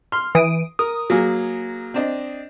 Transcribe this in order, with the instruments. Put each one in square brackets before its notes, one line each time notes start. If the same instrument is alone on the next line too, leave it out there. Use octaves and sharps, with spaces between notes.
[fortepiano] C6 [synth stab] F6
[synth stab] E3 D7 D#7 [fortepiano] D#6
[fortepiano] A#4 [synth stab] D#6
[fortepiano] F#3 A#3 G#4
C4 D4 D#5